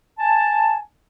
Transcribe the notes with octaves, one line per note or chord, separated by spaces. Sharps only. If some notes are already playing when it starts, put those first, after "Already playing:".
G#5 A5